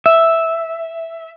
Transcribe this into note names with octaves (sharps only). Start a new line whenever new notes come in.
E5